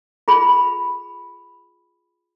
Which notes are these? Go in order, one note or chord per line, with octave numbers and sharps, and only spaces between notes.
F4 G#4 B5